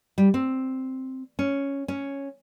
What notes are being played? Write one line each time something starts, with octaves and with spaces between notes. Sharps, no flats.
G3
C4
C#4
C#4